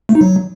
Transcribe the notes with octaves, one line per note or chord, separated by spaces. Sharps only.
A3
D#4
F#3